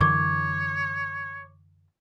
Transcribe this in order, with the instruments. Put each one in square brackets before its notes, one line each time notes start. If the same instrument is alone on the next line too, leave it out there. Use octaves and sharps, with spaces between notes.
[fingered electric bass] F#2 D3 E3 [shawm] C#5 [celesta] C#6 D6 G#6